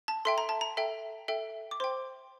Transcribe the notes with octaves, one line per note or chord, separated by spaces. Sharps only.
A5
A4 E5 G5 C6
A#5
A5
A#5
A4 E5 G5
A4 E5 G5
D6
C5 G5 C6